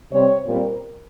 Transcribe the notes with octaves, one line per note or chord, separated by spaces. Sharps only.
C3 G3 C4 C#5
A#2 G3 C4 A#4